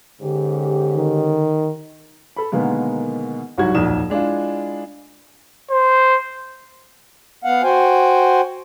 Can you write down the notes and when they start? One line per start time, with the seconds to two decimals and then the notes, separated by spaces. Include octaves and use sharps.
0.21 G#2 D3 C#4 G4
0.96 D#3
2.36 A4 B5
2.52 B2 D3 D#3 G#3 A#3 B3
3.58 C2 G#2 F#3 G3 F#4 G#6
3.75 D#1 B1 F2 D5 D#6 E7
4.10 G#3 D4 E4 F4
5.71 C5
7.44 B3 F5 F#5
7.63 F#4 C5 G5 G#5